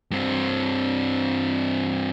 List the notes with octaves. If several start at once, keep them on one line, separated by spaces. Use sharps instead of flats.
G2 C4